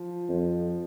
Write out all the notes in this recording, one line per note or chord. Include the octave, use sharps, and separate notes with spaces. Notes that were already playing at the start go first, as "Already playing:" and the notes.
Already playing: F3
F2